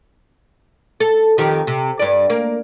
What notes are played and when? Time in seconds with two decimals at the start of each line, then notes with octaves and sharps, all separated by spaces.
1.00 A4
1.38 F2 D#3 G4
1.67 C3
1.99 G2 D5
2.30 A#3